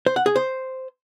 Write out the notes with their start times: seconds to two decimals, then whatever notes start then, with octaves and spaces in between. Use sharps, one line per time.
0.06 C5
0.16 F#5
0.26 G#4
0.36 C5